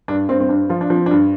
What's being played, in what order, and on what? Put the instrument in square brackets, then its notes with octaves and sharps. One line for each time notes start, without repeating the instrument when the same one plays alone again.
[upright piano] G2 D4
G2 C4
C4
G2 D4
F3 F4
D4
F3 C4
D4
G2